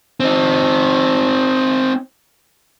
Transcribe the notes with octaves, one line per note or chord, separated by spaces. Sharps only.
C4 D#4